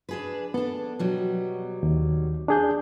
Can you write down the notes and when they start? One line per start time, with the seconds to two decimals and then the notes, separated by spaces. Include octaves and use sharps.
0.09 D4 G#4 B4
0.54 B3 D4 A4
0.99 B2 F#3 G3
1.83 D#2
2.48 D4 G#4 G6